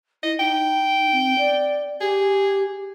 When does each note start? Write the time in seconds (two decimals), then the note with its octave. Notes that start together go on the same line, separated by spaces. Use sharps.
0.23 E4 D#5
0.39 D#4 G5
1.12 C4
1.38 D5
2.01 G4 G#4